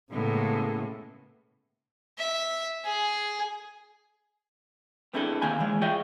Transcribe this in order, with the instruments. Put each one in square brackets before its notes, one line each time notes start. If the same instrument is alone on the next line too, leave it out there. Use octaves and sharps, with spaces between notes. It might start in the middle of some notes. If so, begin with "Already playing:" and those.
[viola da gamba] A2 [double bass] C#3 G#3 [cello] A#3 B3
[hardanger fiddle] E5
G#4
[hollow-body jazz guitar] B3 C4 D4 E4 G#4 A4
E2 C3 D#3 A#3 G#5 B5
D#3 E3 G#3
F4 G#4 C#5 D#5 E5 G5